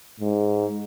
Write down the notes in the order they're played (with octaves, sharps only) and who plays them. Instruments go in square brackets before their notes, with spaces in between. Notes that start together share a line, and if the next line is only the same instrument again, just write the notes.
[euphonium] G#2